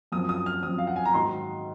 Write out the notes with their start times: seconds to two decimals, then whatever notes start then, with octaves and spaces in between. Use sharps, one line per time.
0.12 F#2 F3 C4 D#6
0.29 D#6
0.46 F6
0.63 F#2 F3 C4 D#6
0.78 F5
0.87 F#5
0.96 G#5
1.05 A#5
1.14 G#2 D#3 F#3 C6